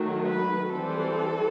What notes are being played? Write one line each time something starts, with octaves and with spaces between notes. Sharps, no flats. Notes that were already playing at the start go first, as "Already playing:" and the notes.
Already playing: D#3 F#3 A3
B4
E3 G3 C4 A4